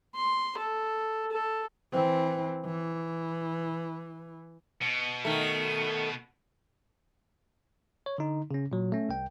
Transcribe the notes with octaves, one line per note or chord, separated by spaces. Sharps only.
C6
A4
A4
E3 C4
E3
B2
D#3 A3
C#5
D3 D#4
C#3 C#4
A#2 F#3
A3 C#4
C2 G5